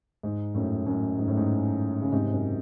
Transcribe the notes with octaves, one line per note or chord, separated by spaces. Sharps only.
G#2
F#2 A2
F#2 A2
G#2
A2
G#2
C#3
G#2 C3
F#2